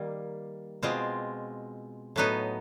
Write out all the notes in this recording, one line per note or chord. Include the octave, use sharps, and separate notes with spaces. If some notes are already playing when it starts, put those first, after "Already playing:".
Already playing: D#3 G3 A#3
B2 G#3 C4 F4
A2 F#3 B3 D#4